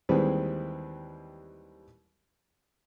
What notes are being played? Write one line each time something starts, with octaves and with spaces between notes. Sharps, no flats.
D#2 E3 G3 G#3 C4 B4